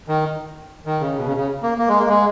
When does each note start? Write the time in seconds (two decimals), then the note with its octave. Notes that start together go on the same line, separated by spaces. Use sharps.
0.08 D#3
0.86 D#3
1.01 C#3
1.16 B2
1.27 C#3
1.37 C#3
1.63 A#3
1.78 A#3
1.88 G#3
1.98 A#3
2.09 G#3